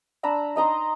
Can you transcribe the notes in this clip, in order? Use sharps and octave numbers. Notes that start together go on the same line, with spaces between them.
D4 A#5 B5 E6
D#4 D#5 A#5 C6